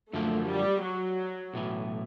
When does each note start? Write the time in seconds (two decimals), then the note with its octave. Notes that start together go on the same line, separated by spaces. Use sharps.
0.13 F#2 D3 F3 A3 A#3
0.48 G3
0.83 F#3
1.54 B1 A2 E3